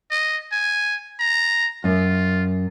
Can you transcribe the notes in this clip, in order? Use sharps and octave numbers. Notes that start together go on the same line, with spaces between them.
D#5
G#5
A#5
F#2 F4